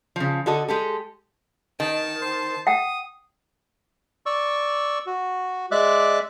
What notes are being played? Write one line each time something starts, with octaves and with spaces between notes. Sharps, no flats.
C#3 F3
D3 F#4 A4 D#5
G#3 G4 A4
D#3 A5
C5
F#5 G5 D#6
D5 C#6 E6
F#4
G#3 D5 E5 D6 F#6